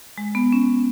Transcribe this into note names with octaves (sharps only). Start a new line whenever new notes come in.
G#3
B3
C#4